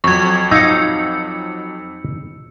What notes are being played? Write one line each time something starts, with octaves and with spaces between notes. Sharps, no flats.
F2 F#3 C#6 G#6
D#4 F5 E6 C#7